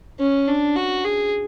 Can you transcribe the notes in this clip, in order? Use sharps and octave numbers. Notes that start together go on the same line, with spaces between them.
C#4
D4
F#4
G#4